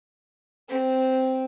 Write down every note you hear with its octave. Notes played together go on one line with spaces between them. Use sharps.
C4